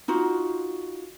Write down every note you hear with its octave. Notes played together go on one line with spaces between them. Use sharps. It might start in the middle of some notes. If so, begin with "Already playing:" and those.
D#4 F4 F#4